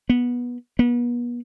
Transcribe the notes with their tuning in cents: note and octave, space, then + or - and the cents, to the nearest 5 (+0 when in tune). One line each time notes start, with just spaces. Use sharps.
B3 -15
B3 -40